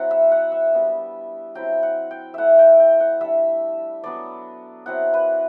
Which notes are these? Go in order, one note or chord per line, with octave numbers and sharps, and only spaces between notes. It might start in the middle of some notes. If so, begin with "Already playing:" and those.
Already playing: F#3 C4 E4 F#5
E5
F#5
E5
G3 B3 D4
F#3 C4 E4 G5
F#5
G5
A3 E4 E5 F#5
G5
G5
F#5
G3 D4 E5
F#3 B3 D4 D5
F#3 C4 E4 F#5
B4